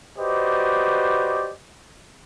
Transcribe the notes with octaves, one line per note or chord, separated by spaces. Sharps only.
F#4 G4 B4 C5 D5 D#5